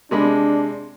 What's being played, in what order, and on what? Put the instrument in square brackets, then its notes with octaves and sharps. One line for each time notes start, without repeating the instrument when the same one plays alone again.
[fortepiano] C3 G#3 B5 [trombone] D4